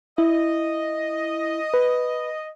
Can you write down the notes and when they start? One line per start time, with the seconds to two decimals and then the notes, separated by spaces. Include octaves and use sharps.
0.18 E4 D#5
1.74 B4